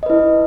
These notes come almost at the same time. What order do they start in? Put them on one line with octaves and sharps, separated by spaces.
D#5 B4 E4